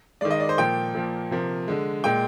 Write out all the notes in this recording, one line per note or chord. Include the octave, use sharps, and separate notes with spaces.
D#3 G#3 D5
D#5
D5
C5
A#2 F3 A#3 G5
A#2 F3 A#3
C3 F3 A#3
D3 G#3
A#2 G#3 G5